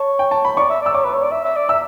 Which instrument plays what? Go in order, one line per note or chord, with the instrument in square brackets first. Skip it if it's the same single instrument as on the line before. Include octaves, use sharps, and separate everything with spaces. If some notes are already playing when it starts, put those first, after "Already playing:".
Already playing: [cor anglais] C#5 [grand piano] A5
[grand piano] G5
A5
B5
[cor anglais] D5 [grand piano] C#6
[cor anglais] E5
[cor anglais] D5 [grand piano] E6
[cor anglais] C#5 [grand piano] D6
[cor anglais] B4
C#5
D5
E5
E5
D5
[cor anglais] E5 [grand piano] E6